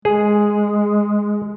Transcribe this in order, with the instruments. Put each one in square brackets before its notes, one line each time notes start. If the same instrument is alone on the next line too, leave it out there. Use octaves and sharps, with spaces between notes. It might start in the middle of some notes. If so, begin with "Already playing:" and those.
[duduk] G#3 [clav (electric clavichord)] G#4